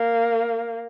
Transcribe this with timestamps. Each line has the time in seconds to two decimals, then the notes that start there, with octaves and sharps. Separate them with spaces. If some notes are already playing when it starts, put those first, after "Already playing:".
Already playing: A#3